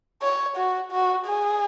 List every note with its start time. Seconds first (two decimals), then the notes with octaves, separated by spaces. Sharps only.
0.22 C#5
0.56 F#4
0.91 F#4
1.26 G#4